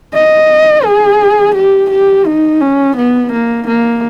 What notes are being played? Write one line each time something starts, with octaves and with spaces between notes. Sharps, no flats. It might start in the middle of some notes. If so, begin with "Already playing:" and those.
D#5
G#4
G4
G4
D#4
C#4
B3
A#3
A#3